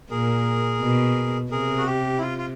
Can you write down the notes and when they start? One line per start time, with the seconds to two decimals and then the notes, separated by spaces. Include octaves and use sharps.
0.10 A#2 G#4 A#4
0.82 B2
1.51 C3 G#4 A#4
1.78 F#4
1.87 G4
2.18 E4
2.21 F4
2.38 F4